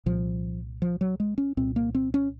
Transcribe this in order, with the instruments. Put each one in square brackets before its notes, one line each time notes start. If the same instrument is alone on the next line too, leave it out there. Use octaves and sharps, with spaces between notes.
[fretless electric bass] C2 A#2 F3
F3
F#3
G#3
C#4
C2 A#2 C4
A#3
C4
C#4